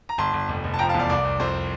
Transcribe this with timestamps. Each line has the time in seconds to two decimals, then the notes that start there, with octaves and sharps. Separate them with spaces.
0.09 A#5
0.18 G1 A5 C6
0.33 G1
0.49 F1
0.64 F1
0.74 A5
0.79 F3 G5 A#5
0.89 F5 A5
0.94 E2
0.99 D5 F5
1.09 C2 D5
1.25 C2
1.40 F2 C5